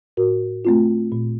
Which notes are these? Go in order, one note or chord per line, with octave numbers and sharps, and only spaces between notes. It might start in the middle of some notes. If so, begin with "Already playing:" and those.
A2 F#4 A#4
A3 C4 F4
A#2